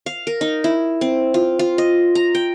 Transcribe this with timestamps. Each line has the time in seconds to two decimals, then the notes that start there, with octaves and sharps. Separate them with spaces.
0.06 F5
0.27 A#4
0.41 D#4
0.64 E4
1.01 C4
1.34 F4
1.59 F4
1.78 D#5
2.15 A#5
2.35 G5